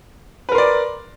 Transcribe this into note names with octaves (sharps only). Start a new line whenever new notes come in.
A#4 B4 D5 C6